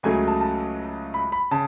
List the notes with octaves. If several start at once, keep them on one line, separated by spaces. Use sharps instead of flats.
C#2 C#3 F#3 A3 G#5
A5
A5
B5
B5
C#3 A5